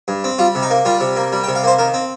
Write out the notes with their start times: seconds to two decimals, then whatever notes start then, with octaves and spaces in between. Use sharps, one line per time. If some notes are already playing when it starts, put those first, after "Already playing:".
0.08 G2
0.24 C4
0.38 G3 F4
0.55 C3
0.63 D#4
0.70 A#3
0.85 G3 F4
1.01 C3
1.16 A#3
1.32 G3
1.44 G5
1.48 C3
1.55 F5
1.63 A#3 C5
1.79 D#3 A#4
1.94 C4